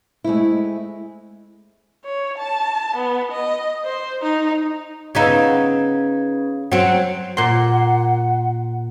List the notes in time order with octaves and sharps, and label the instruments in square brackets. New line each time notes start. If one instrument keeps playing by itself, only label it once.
[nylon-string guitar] G#3 A3 C4 E4
[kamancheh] C#5
A5
B3
D#5
C5
D#4
[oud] C#3 B3 D#4 [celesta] B4 F5 G#6
[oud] F#3 C4 [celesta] F#5
[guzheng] A#2 C6 [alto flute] F#5